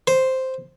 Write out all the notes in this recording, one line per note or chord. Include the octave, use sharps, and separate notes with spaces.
C5